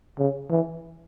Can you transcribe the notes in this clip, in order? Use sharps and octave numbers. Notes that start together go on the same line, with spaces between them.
C#3
E3